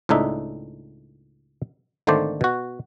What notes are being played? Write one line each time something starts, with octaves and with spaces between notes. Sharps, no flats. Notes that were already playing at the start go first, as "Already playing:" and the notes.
C#2 A2 D4 D#4 E5
G#1 D3 D#3 A3 C5 D5
B2 F#4